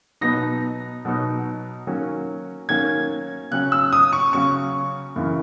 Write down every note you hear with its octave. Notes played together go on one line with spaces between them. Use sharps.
B2 F#3 B3 D#4 A#6
B2 F#3 B3 D#4
D#3 F#3 A#3 C#4
D#3 F#3 A#3 C#4 G#6
C#3 F#3 C#4 F#6
E6
D#6
C#6
C#3 F#3 C#4 C#6
F#2 C#3 E3